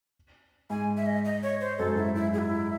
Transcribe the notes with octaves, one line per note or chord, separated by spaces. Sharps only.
G#2 G#5
E5
D#5
D#5
C#5
C5
F#2 A4
G#2
F#2 E4
E4
G#4
E4